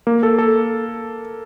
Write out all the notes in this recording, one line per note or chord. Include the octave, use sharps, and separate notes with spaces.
A#3
A4
A4